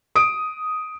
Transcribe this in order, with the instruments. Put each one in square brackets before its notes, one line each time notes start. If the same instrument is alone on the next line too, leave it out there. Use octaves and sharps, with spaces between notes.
[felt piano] D#6 D7